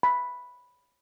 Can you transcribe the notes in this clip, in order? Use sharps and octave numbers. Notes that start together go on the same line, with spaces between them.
B5